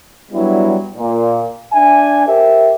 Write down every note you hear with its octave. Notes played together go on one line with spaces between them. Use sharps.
F#3 G3 B3 D4 E4
A#2
D4 E5 G#5
G4 A#4 C5 E5